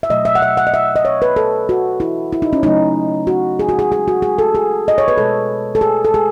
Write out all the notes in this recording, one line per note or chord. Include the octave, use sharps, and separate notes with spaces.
E5
B2 F#3 A3 D#5
E5
F#5
E5
F#5
D#5
E5
D#5
C#5
B4
A4
F#4
E4
E4
D#4
C#4
C#3 F#3 A3 D#4
F#4
G#4
F#4
G#4
G#4
F#4
G#4
A4
G#4
D#5
C#5
B4
B2 G#3 A4
A4
G#4
A4
G#4